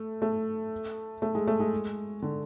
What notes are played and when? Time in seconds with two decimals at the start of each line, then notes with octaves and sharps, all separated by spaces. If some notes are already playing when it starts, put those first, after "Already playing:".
Already playing: A3
0.22 A3
1.22 A3
1.35 G#3
1.47 A3
1.60 G#3
2.22 D3